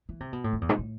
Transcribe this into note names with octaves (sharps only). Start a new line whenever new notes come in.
E3
C3
B2
A2
F2
E2
G#2
A2